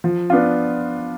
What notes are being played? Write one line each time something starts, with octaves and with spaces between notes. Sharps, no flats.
F3
B3 D4 F4